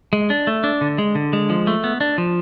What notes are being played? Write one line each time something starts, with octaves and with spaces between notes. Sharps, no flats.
G#3
D4
A3
D4
D3
G#3
D3
G#3
F3
A3
B3
D4
F3